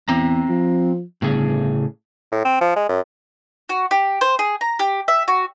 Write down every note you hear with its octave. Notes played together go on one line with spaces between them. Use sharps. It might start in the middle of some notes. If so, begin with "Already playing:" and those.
E2 C4 A#5
F3
G1 A2 C#3 G#4
A2
C4
F3
G#3
F#2
F#4
G4
C5
G#4
A#5
G4
E5
F#4